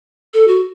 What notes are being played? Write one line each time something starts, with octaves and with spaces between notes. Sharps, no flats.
A4
F#4